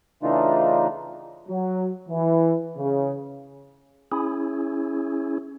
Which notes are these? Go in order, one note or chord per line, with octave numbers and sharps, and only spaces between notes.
C#3 E3 A3 D4 D#4 F4
F#3
E3
C#3
C#4 E4 G#4